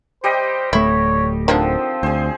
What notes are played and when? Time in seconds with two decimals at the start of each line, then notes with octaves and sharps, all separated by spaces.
0.24 G3 G4 C5 D#5
0.73 D1 A3 E4 C#5
1.48 D3 D#3 F3 C4 D4
2.03 D2 G#4 C5